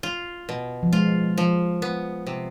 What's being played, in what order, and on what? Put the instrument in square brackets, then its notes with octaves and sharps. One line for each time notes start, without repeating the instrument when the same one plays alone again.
[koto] F4
B2
[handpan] F3
[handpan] G#3 [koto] F4
[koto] F3
B3
C3